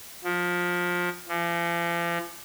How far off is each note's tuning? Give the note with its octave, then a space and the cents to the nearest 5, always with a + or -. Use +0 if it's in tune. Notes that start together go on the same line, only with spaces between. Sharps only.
F3 +20
F3 -40